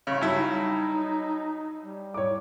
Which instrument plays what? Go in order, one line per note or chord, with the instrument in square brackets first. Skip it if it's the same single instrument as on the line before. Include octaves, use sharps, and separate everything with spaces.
[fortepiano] A1 C#3
[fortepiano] G2 F#3 E4 [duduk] D#4
[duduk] G3
[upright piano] C#5 D6